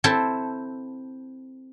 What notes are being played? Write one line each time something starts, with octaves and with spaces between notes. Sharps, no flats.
C4 E4 A4